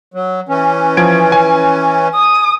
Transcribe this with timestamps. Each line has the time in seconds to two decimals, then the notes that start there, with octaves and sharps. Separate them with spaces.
0.14 F#3
0.49 E3 C#4
0.97 F3 G#6 D7
1.32 G#5
2.14 D#6